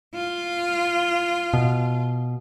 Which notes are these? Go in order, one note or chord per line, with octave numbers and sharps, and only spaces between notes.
F4
B2